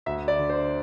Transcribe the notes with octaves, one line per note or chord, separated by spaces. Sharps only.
D2 E5
D5
D3
C5